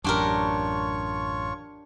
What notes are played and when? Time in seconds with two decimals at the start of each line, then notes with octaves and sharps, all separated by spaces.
0.04 A1 F#2 D4 F4 G4 A#4 C#5 C#6